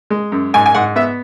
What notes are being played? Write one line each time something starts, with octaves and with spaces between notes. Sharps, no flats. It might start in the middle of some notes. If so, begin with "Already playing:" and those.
G#3
F#2
G#2 G#5
G#5
G#2 F#5
B3 E5